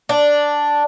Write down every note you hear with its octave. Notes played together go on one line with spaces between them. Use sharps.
D4